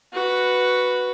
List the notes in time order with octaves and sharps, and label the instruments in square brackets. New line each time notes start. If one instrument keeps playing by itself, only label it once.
[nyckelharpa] F#4 B4